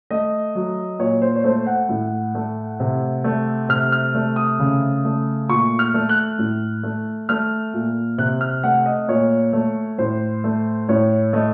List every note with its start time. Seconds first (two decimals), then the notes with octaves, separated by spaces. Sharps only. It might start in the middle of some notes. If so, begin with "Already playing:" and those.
0.11 A3 D#5
0.55 F#3
0.99 A#2 C#5
1.22 C5
1.36 C#5
1.44 A3 C5
1.67 F#5
1.89 A2
2.35 A3
2.80 C3
3.24 A3
3.69 C3 F6
3.92 F6
4.15 A3
4.36 D#6
4.59 C#3
5.05 A3
5.49 A#2 C#6
5.79 F6
5.94 A3
6.09 F#6
6.39 A2
6.83 A3
7.29 A3 F6
7.73 A#2
8.18 C3 F#6
8.41 F6
8.64 A3 F#5
8.86 D#5
9.08 A#2 C#5
9.53 A3
9.98 A2 C5
10.44 A3
10.89 A2 C#5
11.33 A3 D#5